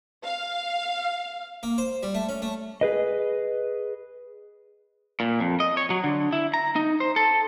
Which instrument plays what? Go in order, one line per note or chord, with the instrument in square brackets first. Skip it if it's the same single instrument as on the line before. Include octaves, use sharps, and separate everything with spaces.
[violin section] F5
[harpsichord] A#3
C5
G3
A3
C#4
A3
[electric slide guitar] G#4 B4 D#5
[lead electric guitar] A#2
F2
D#5
C#5
F#3
D3
E4
A#5
D#4
C5
A4